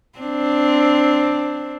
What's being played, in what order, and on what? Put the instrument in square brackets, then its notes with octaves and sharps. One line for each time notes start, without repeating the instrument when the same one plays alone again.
[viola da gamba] C4 D4